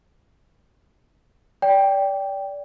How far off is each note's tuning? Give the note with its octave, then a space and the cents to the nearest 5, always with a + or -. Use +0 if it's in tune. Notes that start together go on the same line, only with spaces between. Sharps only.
D5 -25 G5 +0